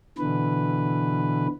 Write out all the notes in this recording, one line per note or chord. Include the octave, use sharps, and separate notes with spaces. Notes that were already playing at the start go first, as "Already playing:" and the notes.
B2 D3 E3 B4